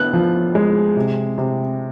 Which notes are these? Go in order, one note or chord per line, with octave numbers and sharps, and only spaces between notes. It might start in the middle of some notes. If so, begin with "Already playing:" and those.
Already playing: D3 B3 F#6
F3
G#3
C3
C3